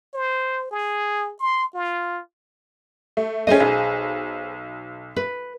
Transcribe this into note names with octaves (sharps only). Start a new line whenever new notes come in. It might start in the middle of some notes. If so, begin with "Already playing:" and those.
C5
G#4
C6
F4
A3
A3 C#4 G#4 C5 D#5
B1
B4